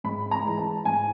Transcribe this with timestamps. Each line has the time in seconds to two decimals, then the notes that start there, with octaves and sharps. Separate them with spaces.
0.04 G#2 B5
0.31 A#5
0.44 E3 G#3
0.59 A5
0.85 G#2 G#5